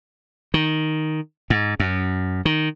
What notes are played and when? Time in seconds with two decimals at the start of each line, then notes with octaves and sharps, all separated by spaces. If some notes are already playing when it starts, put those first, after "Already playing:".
0.54 D#3
1.50 G#2
1.80 F#2
2.45 D#3